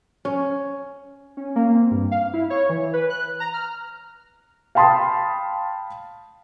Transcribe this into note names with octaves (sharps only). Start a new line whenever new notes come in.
C#4
C#4
A#3
C4
G2
F5
E4
C#5
E3
B4
F#6
A#5
F6
F5 G5 A5 B5 C6 D#6